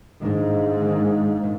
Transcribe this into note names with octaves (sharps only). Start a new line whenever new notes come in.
G#2 D#3 A#3 D4
D#3 A#3 D4
A#2